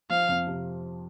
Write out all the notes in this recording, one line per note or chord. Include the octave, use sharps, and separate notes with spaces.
F3 F5
F2
C3